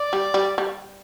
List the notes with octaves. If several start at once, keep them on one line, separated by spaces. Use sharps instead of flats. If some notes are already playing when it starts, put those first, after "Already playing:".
Already playing: D5
G3
G3
G3